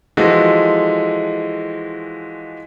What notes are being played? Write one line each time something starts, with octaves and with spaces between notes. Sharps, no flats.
E3 F3 G#3 F#4 A4